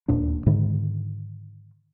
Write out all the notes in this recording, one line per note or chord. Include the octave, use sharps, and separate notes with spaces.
D1 D#2 A#2 D4
G#2 D3 D#3